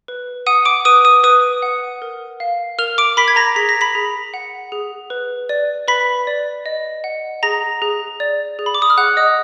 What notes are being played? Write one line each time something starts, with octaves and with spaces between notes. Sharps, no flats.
B4
F#5 D#6 D#7
D6 D7
B4 D#6 D#7
D#6 D#7
B4 D#6 D#7
F#5
A#4
F5
A#4 F6 F7
D6 D7
A#4 B5 B6
G#6
A#5 A#6
G#4 B6
A#6
B5 B6
G#4
F#5
G#4
B4
D5
B4 B5 B6
D5
D#5
F#5
G#4 A#5 A#6
G#4
D5
G#4
B5
D6
D#6
F6
G#4 F#5 F#6
D#5 D#6